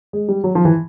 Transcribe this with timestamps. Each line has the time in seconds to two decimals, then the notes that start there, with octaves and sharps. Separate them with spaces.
0.13 G#3
0.28 G3
0.44 F#3
0.55 F3
0.65 E3